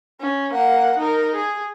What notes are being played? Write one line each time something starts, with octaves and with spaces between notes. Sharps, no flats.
C#4
A#3 F#5
D#4 A#4
G#4